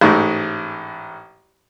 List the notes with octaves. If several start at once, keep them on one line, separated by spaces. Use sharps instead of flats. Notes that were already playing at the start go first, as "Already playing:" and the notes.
A1 G#2 A3